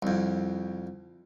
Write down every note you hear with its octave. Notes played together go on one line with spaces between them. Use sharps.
C2 F2